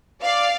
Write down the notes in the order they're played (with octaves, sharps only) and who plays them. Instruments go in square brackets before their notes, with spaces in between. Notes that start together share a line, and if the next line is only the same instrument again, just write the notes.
[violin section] D5 F5